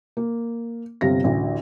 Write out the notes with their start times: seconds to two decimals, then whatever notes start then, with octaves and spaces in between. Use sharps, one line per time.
0.17 A#3
1.01 G1 C3 F5 A#6
1.24 A1 D2